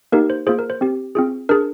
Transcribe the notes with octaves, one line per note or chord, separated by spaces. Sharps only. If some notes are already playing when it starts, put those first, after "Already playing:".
A#3 D#4 G4 A#4
C5
A#3 F4 G#4 C5
A#4
C5
C4 G4
C4 F4 G#4
D4 G#4 A#4